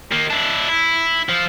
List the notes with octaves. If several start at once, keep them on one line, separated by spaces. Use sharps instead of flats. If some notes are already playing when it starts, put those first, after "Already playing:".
D#3 A#3
D4 E4
E4
F3